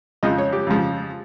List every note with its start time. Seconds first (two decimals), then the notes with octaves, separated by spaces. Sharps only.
0.23 F2 C#3 F3 D#5
0.38 C#5
0.53 G4
0.67 F2 C#3 F3